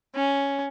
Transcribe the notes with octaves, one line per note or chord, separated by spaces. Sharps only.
C#4